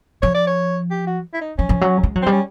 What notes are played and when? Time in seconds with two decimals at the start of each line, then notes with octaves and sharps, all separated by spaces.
0.22 F3 C#5
0.35 D5
0.47 C#5
0.91 G4
1.07 F#4
1.34 E4
1.41 D#4
1.58 F3 C#4
1.69 F3
1.81 F#3
2.03 G#3
2.15 F#3
2.22 G3 C4
2.32 C#4